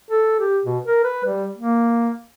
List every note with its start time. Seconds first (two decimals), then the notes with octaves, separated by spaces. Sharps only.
0.10 A4
0.40 G4
0.64 B2
0.86 A#4
1.04 B4
1.24 G3
1.57 A#3